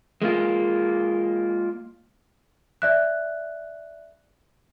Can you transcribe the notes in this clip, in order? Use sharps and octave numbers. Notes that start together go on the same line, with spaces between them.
G#3 A#3 F4
D5 E5 F#6